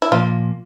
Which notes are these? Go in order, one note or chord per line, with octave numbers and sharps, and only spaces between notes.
E4
A#2 F3 A#3 F4